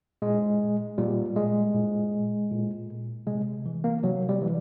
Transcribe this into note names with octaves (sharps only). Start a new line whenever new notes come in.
A#2 G#3
A#2 G3
G#3
A#2
A#2
C3 G#3
E3
A#3
C3 F#3
G3
E3